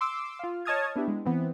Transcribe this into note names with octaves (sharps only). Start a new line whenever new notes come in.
C6 D6 E6
F4 F5
C#5 D#5 A5 D#6 F6 G#6
B3 D4 E4 G4
G#3
E3 B3 C4